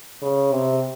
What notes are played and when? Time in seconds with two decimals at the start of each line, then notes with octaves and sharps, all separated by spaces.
0.22 C#3
0.52 C3